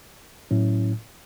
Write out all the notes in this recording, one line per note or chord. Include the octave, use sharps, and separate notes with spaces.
A2 F#3 C#4 E4